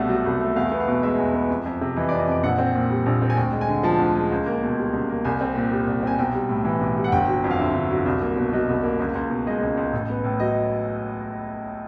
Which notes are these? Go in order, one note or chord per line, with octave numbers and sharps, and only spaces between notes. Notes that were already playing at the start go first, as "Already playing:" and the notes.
Already playing: C2 B2 G3 A3 F5 F#5
F#3
C2
A3
E2 F5
B3
F5
B2
G#3 E5
E2
B3
F2
F2
C3
E3 D#5
D5
F2
D#5
F2 D5
A#1 F#5
C4
A#2
G3
A#1
C4
G#5
D2 G5
G#3
G#5
D3
F3 A5
D2
G#3
C#2
A#3
B2
G3
C#2
A#3
C2 G#5
C4
A#2
G3
C2
C4 G#5
B1 G5
G3
A2
E3
B1
G3
F#5
G1 G5
F#3
F2
F5
D3 E5
G1
F#3
C2
A#3
B2
F#3 D#5
C2
A#3
C#2
C#2
B2
G#3 D#5
C#2
C#2
A1
B3
A2
F#3 D#5